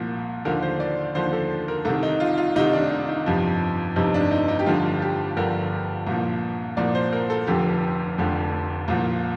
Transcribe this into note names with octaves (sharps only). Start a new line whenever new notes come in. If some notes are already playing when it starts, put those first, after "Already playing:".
Already playing: C2 A#2 F3
D#2 D3 F3 A#4
C5
D5
D#2 D3 F3 C5
A4
A#4
C2 C3 D#3 A4
D#4
F4
F4
C2 C3 D#3 D#4
D4
D#4
D#4
G1 F2 C3 F3
G1 F2 C3 F3 D#4
D4
D#4
D#4
G4
G1 G2 D3 F3 F4
G4
G1 G2 D3 F3 A#4
C2 A#2 F3
C2 A#2 F3 D5
C5
A#4
A4
F1 F2 D3 F3 G4
F1 F2 D3 F3
C2 A#2 F3 F4